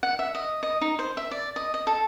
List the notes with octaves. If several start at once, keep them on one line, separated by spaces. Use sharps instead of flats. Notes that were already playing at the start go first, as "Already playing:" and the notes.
F#5
E5
D#5
D#5
D#4
C5
E5
D5
D#5
D#5
A4